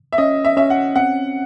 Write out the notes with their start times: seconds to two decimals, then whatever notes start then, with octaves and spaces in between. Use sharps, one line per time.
0.13 E5
0.18 C#4 D#5
0.45 E5
0.57 C#4 E5
0.70 F#5
0.96 C4 F#5